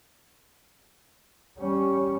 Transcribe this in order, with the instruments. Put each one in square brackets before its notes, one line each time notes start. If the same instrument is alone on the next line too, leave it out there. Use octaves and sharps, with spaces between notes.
[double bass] G3 C#4